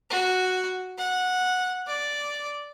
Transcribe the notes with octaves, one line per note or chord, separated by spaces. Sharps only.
F#4
F#5
D5